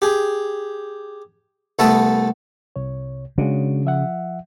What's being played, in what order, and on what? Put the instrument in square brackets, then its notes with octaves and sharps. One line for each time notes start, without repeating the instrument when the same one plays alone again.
[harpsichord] G4 G#4
C2 A3 B3 E5 A5 D#6
[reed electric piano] C2 C3 C#5
[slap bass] C#3 [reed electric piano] G#3 D4 F#4
[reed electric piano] F3 E5 F#5